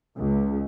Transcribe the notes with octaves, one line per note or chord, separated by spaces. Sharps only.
C#2